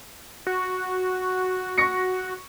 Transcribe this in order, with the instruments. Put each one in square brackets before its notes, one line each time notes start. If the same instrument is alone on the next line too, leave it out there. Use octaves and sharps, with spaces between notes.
[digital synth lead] F#4
[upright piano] C#6 A#6 C#7